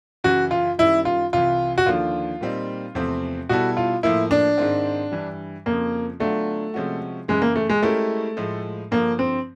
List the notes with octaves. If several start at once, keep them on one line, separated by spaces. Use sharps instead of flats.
F#2 C#3 E3 F#4
F4
F#2 D#3 G3 E4
F4
C2 C3 E3 F4
F#4
D#2 D3 F3 A#3 D4 F4
A#2 G3 C4 D#4
E2 C3 F3 A3 C4
B2 G3 B3 E4 F#4 A4
F4
A2 F3 A#3 E4
D4
G#2 D#3 G#3 C4
G2 E3 G3
F2 C#3 F3 A#3
D3 F#3 A3 B3 D4 F4
C3 F3 G#3 C#4 F#4
F#2 C#3 E3 G#3
A#3
A3
G#3
G#3 A3 C#4 E4 G4 A#4
A2 F3 G#3
G2 D3 F3 A#3
C4